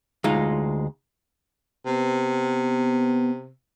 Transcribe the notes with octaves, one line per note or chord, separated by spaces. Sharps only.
D2 G#3 D#4 F4
C3 B3